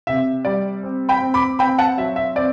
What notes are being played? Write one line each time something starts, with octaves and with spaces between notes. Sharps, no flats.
C3 E5
G3 D5
C4
G5 B5
C4
B5 D6
C4 G5 B5
F#5 A5
F#3 E5
E5
C4 D5